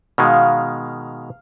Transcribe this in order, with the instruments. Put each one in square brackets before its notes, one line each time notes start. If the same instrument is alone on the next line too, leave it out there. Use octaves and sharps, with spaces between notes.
[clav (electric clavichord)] B2 D#3 G#3 [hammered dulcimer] F5